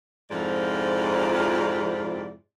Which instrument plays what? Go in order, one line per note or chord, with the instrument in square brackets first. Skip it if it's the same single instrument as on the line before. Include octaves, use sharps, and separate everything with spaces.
[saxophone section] F2 G#2 C3 F3 E4 D5